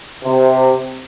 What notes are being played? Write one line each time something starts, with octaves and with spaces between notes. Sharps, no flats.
C3